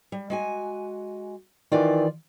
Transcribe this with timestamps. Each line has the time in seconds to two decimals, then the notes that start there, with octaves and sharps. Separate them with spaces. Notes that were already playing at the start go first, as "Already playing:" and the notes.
0.12 G3
0.30 G#3 F#4 G#5
1.72 D#3 E3 F4 D5